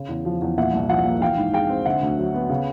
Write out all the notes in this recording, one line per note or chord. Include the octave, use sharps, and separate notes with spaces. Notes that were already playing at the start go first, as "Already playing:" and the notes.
Already playing: C#3
E2
F3
E2
A#2 E5 F#5
C2
F3 E5 F#5
A#3
E3 F5 G5
G#2
G#3 F5 G5
C4
D3 E5 F#5
D2
F#3
B3
C#3